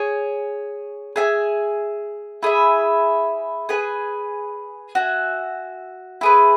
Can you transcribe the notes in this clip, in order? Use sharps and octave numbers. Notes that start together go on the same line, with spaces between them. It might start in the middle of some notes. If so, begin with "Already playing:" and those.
Already playing: G#4 C#5 G#5
G#4 E5 G#5
E4 G#4 E5
G#4 B4 G#5
F#4 E5 G#5
E4 G#4 B4